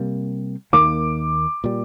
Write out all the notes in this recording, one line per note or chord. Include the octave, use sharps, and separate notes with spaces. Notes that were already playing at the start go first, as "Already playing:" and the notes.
Already playing: C3 G3 A#3
D#2 D#3 A#3 D6
A#2 G3